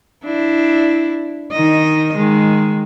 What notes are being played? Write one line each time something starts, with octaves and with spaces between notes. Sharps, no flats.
D4 E4
D#3 D#4 D#5
D#3 G#3